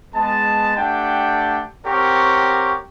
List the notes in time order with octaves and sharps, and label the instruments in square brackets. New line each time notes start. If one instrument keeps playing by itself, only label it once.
[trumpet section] G#3 B3 A5
A3 D4 G4 F#5 G5 A5
C4 G4 A#4 C#5 F#5 C#6